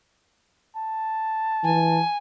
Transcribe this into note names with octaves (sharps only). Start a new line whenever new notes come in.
A5
E3 G#5